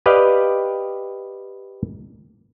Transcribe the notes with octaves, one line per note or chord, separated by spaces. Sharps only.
G4 B4 D5 D#5 F5 G5